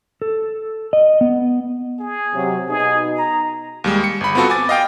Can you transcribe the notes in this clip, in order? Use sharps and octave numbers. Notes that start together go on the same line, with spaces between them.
A4
D#5
B3
G#4
C3 F#3
B2 D#4 G#4
A#5
D#2 G3 G#3
C#7
G1 B5
B3 C4 F4 F#4 A4
G#5 D6 A6
D#5 F5 G5